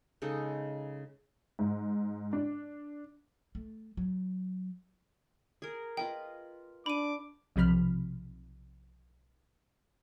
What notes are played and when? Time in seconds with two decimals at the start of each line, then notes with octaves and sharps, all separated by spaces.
0.22 C#3 G#3 D#4 A4
1.59 G#2
2.33 D4
3.55 A3
3.97 F#3
5.62 G#4 A#4
5.97 F4 B4 D#5 G5
6.86 D4 B5 D6 D#7
7.56 B1 C3 F3 B5 F6